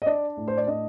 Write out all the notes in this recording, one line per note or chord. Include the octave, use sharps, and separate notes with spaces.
D#5
D4 D5
A2
C5
D5
D4 D#5